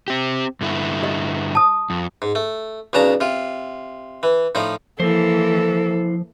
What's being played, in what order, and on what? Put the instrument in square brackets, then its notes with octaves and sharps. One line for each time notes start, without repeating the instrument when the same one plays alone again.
[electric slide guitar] C4 G4
G2 D3 E4
[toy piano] G4 D#5
A5 D#6
[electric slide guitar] F2
[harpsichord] G#2
A3
B1 C#3 D4 A5 A#5
C3 F4
E3
A2 F3 D#4
[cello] E3 A#3 [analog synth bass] F3 [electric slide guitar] E4 C5 [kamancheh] A4